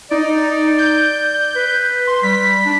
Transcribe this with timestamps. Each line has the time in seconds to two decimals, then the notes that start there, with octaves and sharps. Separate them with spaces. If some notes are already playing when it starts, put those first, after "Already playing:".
0.11 D#4 D5
0.78 G6
1.56 B4
2.07 C6
2.23 G3 B6
2.66 D4